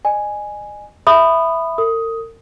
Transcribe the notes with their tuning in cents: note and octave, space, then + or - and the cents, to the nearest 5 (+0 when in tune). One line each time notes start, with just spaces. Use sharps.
D#5 -40 G#5 +0
E5 +0 B5 +10 D#6 -15
A#4 -45 D#6 +10